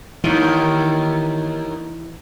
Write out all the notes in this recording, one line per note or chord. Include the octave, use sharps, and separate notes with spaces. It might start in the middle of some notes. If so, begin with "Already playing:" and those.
D#2 D#3 E3